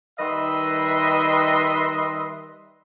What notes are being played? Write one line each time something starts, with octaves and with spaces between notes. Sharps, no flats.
D#3 G3 B4 D#5 E5 C6